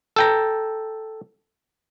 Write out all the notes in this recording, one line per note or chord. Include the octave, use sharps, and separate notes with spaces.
A4 G5 A#5